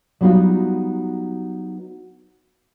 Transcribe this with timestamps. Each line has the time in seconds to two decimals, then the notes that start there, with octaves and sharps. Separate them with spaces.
0.21 F#3 G3 B3 D#4 F4 F#4